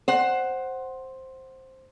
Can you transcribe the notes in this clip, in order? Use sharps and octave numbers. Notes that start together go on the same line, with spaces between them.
C5 F#5